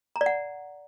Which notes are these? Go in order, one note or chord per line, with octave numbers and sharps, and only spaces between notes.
A#5
D5
F#5